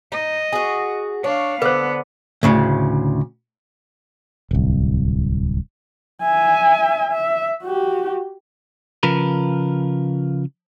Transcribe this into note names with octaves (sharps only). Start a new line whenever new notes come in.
D#4 D#5
F#4 G#4
D4 C#5 F5
D3 B3 B4 C5
D2 A2 C#3
D1 C2
E5 G#5
E5
F#4 G4
C#3 F3 F4 A#4 B4